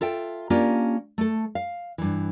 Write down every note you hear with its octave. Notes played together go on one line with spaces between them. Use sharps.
F4 A4 E5 G5
A#3 C#4 D4 F4 G4
A3 A4
F5
G2 E3